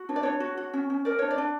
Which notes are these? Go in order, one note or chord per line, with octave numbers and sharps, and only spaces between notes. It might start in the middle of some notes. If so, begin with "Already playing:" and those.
Already playing: F#4
D4 C#5
D5
D4 C#5
F#4
F#4
C#4
C#4
A#4 D5
D4 C#5
D5
D4